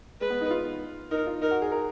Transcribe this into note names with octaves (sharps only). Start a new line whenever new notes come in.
G#3 B4
B3
D#4
F4
D#4 A#4
F4
D#4 A#4
F#4
G#4
A#4